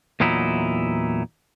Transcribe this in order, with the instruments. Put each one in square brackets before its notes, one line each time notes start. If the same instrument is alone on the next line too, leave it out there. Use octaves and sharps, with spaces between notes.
[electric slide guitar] E2 A#2 F#3 D#4 E4